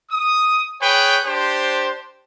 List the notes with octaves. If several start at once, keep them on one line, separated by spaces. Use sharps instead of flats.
D#6
G#4 B4 C#5 G5
D4 G4 C5